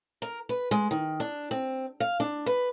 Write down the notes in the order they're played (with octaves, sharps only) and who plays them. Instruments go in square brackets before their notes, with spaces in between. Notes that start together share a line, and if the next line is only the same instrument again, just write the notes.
[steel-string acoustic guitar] A#4
B4
G#3
D#3
D4
C4
F5
D4
B4